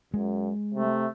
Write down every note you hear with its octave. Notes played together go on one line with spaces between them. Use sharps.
F#2 G#3
C3 A3